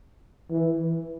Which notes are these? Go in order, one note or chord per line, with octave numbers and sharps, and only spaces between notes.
E3